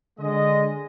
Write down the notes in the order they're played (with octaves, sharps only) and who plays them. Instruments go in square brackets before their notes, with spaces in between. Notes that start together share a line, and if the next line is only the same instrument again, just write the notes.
[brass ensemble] D3 G#3 D#5